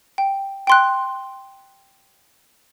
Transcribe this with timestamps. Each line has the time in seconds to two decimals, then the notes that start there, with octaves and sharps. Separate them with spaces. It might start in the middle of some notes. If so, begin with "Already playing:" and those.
0.18 G5
0.67 G5 C6 F#6